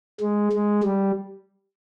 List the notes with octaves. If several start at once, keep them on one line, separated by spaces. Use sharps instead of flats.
G#3
G#3
G3